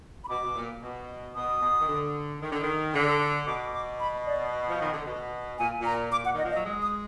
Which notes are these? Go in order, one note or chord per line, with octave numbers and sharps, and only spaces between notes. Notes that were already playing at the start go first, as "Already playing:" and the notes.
B5
B2 D6
B2
A#2
B2
B2 D#6
B2
D#3
D3
D#3
D3
D#3
D3
B2 D6
D6
B5
D5
F3
D#3
D3
B2
A#2 G#5
A#2
A#5
A#2 D6
F#5
D#3
D#5
F3
F#3 D#5
G#3
D#6